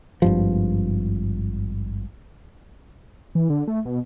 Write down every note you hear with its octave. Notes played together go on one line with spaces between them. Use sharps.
G#1 G2 F3
E3
D3
A3
B2